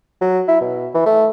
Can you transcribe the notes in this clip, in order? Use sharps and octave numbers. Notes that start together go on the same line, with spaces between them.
F#3
E4
B2
E3
A3